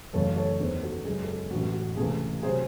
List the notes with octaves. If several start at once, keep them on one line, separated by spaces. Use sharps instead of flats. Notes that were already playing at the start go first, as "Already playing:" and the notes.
F#1 F#2 C#3 E3 A3 A4 C#5
A4 C#5
E1 E2 D#3 G#4 C5
F#4 A4
F#2 C#3 G#3 G#4
A4
G#4
A1 A2 E3 A3 F#4
F#4
C#2 C3 E3 A3 G#4
C3 F#3 G#4 C5